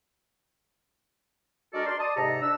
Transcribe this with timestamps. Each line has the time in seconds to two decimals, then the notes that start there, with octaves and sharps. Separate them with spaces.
1.74 G#3 D4 F#4 A4 A#4 D5
1.87 A#4 D5 C6
1.99 D5 A5 D#6
2.16 G#2 C3 G4 A4 A#5
2.42 D4 E6